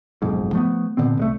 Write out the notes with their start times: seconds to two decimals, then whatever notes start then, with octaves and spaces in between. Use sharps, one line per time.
0.22 F#1 B1 F2 G#2
0.53 F3 A3 B3
0.97 A#2 D3 B3 C4
1.17 C2 G#3 A3